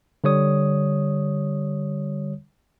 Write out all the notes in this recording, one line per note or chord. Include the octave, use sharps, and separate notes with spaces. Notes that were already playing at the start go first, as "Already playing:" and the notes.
D3 G3 C#5 D#6